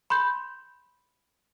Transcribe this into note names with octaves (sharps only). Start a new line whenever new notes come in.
B5 C6 G6